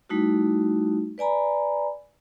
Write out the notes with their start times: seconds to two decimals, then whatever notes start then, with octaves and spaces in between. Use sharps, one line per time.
0.09 G3 A3 D#4 E4 F#4
1.18 B4 D5 G#5 A#5 B5